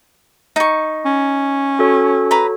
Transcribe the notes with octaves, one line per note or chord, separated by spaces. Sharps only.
D#4 C#6
C#4
F#4 A4 C#5
B4 A#5 B5